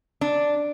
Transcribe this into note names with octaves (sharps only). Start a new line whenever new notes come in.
D4